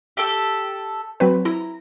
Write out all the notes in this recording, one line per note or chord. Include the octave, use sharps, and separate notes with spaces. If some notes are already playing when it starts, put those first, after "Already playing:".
G4 A4
F#3 C4 B4
E4 A#5